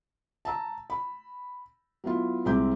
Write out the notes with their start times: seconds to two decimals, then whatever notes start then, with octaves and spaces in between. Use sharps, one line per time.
0.45 A5 A#5 E6
0.90 B5
2.04 F#3 B3 E4 F4
2.46 C2 G#3 C4 E5 D6 G6